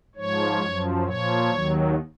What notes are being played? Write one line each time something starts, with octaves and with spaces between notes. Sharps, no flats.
G#2 F3 C#5
F#2 F3
A#2 F3 C#5
D#2 D#3 F#3